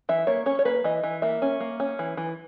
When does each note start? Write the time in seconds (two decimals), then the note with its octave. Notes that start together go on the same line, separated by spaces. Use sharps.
0.09 E3 E5
0.27 A#3 C#5
0.46 C#4 C#5
0.59 C#5
0.65 A#3 B4
0.84 E3 D#5
1.03 E3
1.22 A#3 E5
1.42 C#4
1.60 A#3
1.80 C#4
1.99 E3
2.17 E3